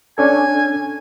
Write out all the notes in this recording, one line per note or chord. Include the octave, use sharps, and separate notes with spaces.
C#4 D4 A4 G#5